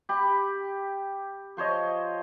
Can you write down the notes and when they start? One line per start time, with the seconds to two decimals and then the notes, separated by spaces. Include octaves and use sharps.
0.09 G4 B5
1.57 F3 C5 C#5 D#5